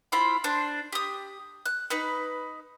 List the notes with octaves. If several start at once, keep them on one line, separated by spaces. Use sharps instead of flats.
E4 F4 C5 B5
D4 C5
G4 D#6
F#6
D#4 B4